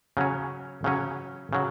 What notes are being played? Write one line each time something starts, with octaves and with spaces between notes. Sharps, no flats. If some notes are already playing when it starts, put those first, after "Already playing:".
C#3 F#3 C#4
C#3 F#3 C#4
C#3 F#3